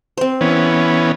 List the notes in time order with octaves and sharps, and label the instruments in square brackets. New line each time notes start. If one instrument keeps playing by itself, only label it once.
[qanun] C4 C5
[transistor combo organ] E3 B3 C#4